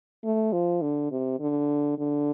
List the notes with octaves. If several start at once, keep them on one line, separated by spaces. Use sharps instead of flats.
A3
F3
D3
C3
D3
D3